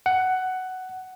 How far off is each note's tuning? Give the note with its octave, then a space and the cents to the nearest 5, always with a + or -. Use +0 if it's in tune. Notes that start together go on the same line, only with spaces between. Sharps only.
F#5 +10